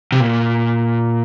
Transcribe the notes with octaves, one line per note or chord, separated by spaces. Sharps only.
C3
A#2